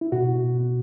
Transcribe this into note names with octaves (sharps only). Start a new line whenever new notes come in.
E4
B2 F#4
B2
B2
B2